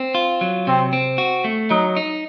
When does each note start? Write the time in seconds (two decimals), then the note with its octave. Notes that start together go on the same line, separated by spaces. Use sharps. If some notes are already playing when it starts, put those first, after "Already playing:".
Already playing: C4
0.15 F4
0.41 F#3
0.67 C3 C4
0.93 C4
1.18 F#4
1.44 A3
1.70 F#3 D#4
1.97 D#4